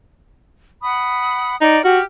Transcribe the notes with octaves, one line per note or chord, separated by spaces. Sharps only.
F#5 B5 D#6
D#4 D5 F#5
F#4 G4 F6